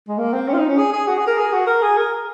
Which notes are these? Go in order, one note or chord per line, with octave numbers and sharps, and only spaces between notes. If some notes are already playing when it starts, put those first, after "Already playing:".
G#3
A#3
C4
C#4
F4
D#4
C#4
G#4
G#4
F#4
G#4
A#4
G#4
F#4
A#4
G#4
A#4